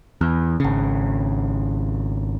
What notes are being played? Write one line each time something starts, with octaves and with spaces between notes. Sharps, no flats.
E2
G#1 C#3